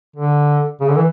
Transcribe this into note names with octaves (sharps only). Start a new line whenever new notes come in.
D3
C#3
D3
E3